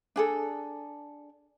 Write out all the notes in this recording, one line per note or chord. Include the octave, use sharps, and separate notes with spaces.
D4 G#4 A4